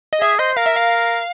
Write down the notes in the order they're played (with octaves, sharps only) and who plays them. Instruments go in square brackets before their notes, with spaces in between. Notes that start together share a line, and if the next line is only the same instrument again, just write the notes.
[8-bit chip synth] D#5
[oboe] G#4 [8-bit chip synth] E5
[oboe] C5 [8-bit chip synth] D#5
[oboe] A#4 [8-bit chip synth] F5
[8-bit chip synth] E5
F5